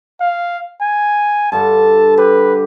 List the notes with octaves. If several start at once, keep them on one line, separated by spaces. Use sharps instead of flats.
F5
G#5
G2 D3 A4 A5
G4 B4